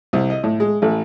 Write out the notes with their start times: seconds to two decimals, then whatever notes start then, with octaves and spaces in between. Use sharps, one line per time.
0.13 C2
0.30 D#5
0.43 A2
0.60 G#3
0.82 A1